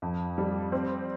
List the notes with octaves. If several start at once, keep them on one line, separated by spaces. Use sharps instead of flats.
F2
G3
C4